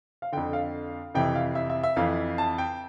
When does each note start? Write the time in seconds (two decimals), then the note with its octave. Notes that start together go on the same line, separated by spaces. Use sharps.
0.22 F5
0.32 F2 D3 G5
0.53 F5
1.14 F2 C3 E3 G5
1.35 F5
1.55 E5
1.70 E5
1.83 E5
1.96 F2 E3 F5
2.38 A5
2.58 G5